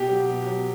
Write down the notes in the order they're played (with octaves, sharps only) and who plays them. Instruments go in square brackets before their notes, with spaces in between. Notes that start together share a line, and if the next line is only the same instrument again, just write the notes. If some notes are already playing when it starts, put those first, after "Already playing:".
Already playing: [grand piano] B2 G4
F#3
B2
F#3